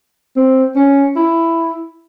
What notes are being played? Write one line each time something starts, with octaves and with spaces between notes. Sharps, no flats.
C4
C#4
E4